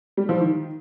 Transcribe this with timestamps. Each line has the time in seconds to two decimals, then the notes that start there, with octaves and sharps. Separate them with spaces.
0.17 G3
0.29 F3
0.40 D#3